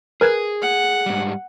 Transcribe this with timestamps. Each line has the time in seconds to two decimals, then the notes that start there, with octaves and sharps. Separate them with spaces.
0.21 G#4 A#4 B4 G#6
0.62 F#5
1.06 G#2 G3